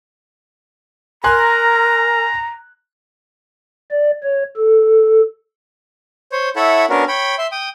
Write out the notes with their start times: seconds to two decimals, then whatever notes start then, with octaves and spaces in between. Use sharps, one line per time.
1.24 A#4 G#5 A#5 C6 F#6
3.91 D5
4.23 C#5
4.56 A4
6.32 C5 C#5
6.56 E4 A4 C#5 E5 F#5
6.90 B3 C#4 D4 F#4 A#4
7.08 C#5 G5 B5
7.38 E5 C6
7.52 G5 D#6